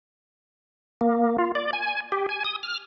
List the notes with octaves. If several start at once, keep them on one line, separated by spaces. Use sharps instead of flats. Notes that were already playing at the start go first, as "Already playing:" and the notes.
A#3
F4
D5
G#5
G4
G#5
D#6
F6